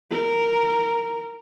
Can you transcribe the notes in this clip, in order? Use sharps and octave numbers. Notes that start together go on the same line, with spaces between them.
A#4